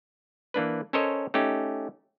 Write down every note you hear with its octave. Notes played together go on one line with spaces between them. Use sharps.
E3 A#3 D4 B4
C#4 A4 A#4 C5 C#5 D#5
A3 C#4 D#4 G4